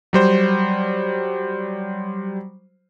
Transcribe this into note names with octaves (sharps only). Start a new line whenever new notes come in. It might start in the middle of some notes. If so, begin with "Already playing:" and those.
F#3 G3 C5